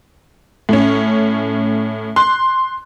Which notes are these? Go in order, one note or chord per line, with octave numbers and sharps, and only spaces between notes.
A2 C#4
C6 F#6